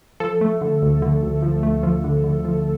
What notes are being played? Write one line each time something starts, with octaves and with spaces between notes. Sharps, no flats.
F3 A4
A3
D3
D2
D3
D2
F3
A3
F3
D3
D3
F3